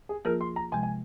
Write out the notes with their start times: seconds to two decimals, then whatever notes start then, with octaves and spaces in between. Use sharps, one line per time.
0.09 G#4
0.25 F3 A#3 F4 G#4 A#4
0.41 C6
0.56 A#5
0.72 C3 F3 G#3 G#5
0.83 G#5